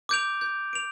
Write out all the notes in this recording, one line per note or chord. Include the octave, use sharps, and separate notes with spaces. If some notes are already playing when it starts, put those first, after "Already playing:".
D6 G6 D7 F7
G6
D7 F7